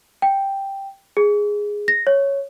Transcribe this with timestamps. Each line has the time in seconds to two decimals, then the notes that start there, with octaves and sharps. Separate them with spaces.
0.22 G5
1.17 G#4
1.88 A#6
2.07 C#5